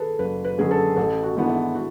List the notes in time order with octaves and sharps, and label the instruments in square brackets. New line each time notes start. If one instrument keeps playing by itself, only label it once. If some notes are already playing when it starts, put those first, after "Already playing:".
Already playing: [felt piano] G#4 A4 B4
[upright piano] F#1 [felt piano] B4
[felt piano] B4
[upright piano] F#2 D3 G#3 C#4 [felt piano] G#4
[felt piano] A4
[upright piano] A1 [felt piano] A4
[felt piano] F#4
[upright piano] G#2 E3 B3 [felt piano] D4
[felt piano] E4
F#4